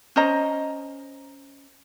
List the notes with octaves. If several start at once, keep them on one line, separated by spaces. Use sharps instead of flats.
C#4 C5 D#5 A#5